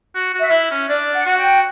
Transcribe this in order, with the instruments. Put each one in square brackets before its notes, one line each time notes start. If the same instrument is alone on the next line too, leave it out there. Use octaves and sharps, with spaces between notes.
[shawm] F#4
F#4
[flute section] E5
[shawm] E4
C#4
[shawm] D4 [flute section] D5
[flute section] F#5
[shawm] F#4
[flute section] G5